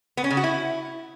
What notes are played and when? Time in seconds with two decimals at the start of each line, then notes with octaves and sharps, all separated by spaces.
0.17 B3
0.24 C#4
0.31 C#3
0.37 F#4
0.44 E4